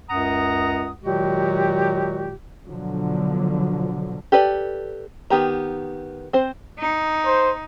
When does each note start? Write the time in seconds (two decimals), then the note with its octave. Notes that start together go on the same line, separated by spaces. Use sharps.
0.10 C#2 F#2 F#5 A#5 D#6
1.04 A#2 D#3 F#3 G#3 F#4 G4
2.66 B2 D3 F3 F#3
4.32 G4 A4 B4 D5
5.30 D#3 B3 G4 A#5
6.33 C4 C5
6.79 D#4
7.26 C5